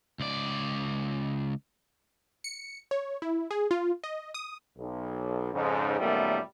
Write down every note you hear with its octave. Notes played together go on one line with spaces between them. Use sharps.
C#2 D5
C#7
C#5
E4
G#4
F4
D#5
D#6
B1
F2 G#2 C#3
F#2 A#2 D#3 G3 A3 B3